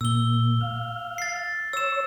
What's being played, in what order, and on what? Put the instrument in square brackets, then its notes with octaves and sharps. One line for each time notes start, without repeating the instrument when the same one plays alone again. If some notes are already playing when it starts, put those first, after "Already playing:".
[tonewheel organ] A#2 [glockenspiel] E6 G7
[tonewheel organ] F5
[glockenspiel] A6 C7
[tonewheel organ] C#5 [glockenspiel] E6 E7